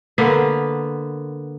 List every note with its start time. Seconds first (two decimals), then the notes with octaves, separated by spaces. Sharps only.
0.18 D3 A#3 B3 B4